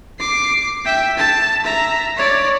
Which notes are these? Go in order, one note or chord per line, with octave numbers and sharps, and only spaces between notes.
D6 C7
E5 G5
A5
E5 A#5
C#5 D5